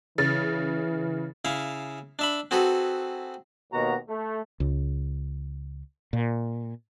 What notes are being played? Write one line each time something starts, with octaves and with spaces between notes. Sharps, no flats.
C#3 E3 A6
C#3 E4 F5
D4 E5 B5
C4 F#4 G#4 A4 B4
D#2 B2 F#4 A#5
A3
C#2
A#2